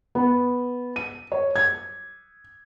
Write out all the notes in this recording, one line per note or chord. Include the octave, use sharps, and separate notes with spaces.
B3
D#7
C#5
G#6